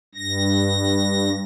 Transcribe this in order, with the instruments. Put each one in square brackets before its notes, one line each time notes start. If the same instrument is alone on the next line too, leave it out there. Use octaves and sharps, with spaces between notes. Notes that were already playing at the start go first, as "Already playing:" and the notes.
[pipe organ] G2 A#6